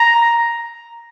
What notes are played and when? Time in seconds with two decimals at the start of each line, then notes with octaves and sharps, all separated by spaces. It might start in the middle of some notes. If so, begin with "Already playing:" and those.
Already playing: A#5